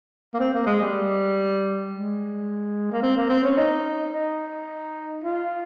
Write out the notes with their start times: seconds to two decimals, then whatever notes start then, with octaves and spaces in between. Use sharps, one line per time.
0.34 A#3
0.39 C4
0.53 A#3
0.66 G#3
0.81 G3
1.91 G#3
2.92 A#3
3.02 C4
3.16 A#3
3.29 C4
3.44 C#4
3.57 D#4
4.13 D#4
5.24 F4